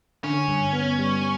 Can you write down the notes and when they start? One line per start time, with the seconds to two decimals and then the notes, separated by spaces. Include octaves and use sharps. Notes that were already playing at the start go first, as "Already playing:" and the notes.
0.24 D3 C#4
0.48 G2
0.73 B3
0.99 G3